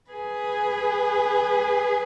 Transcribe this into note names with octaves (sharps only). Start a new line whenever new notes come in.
G#4 B4